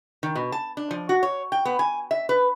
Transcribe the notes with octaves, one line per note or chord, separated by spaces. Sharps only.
D#3
B2
A5
D4
F3
F#4
C#5
G5
B3
G#5
E5
B4